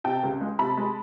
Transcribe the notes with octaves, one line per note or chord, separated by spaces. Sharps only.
C3 G5 A5
C#2
G#3
C3 A5 B5
G#3